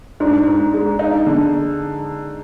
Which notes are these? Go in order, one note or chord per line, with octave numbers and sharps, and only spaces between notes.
G#2 D4
G#2
G#3
D#4
D3